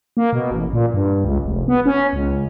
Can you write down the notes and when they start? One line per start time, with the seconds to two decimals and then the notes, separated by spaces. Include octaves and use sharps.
0.17 A#3
0.33 B2
0.51 A1
0.73 A#2
0.94 G2
1.25 C#2
1.45 F1
1.68 B3
1.86 C#4
2.13 C#2